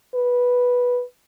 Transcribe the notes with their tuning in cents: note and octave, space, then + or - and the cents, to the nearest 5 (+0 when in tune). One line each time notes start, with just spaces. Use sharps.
B4 -10